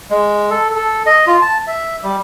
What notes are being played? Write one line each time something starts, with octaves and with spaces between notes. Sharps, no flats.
G#3
A4
A4
D#5
F4
A5
E5
G3